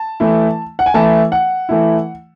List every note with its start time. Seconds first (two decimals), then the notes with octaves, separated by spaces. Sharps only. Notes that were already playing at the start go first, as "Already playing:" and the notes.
Already playing: A5
0.20 E3 A3 E4
0.79 F#5
0.86 G#5
0.94 E3 A3 E4 A5
1.32 F#5
1.69 E3 A3 E4